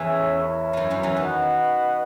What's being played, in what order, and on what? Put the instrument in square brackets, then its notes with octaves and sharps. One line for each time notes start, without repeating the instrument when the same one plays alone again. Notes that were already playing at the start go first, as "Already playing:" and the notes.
Already playing: [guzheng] E2 E3 [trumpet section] C#4 G#4 C#5 E5
[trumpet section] E4 A#4 C#5 E5
[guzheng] F#2 E3 F#3
F#2 F#3
E2 E3
[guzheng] D#3 [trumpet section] F#4 B4 D#5 F#5